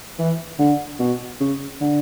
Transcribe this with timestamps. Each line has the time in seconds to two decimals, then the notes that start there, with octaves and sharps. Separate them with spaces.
0.19 E3
0.59 D3
0.99 B2
1.40 C#3
1.81 D3